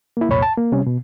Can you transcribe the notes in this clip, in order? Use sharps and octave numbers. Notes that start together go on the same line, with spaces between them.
A#3 E4
C2 F2 A#2 C#5 B5
A5
A#3
C3 G3 C#4
B2